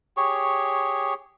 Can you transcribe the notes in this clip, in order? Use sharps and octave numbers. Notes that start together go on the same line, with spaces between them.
G4 G#4 C#5 C#6